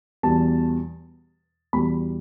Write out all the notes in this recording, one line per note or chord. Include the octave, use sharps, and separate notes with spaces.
E2 B2 G3 A5
E2 B2 G3 B5